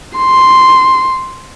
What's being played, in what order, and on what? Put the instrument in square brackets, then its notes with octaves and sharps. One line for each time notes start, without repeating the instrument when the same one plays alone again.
[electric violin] C6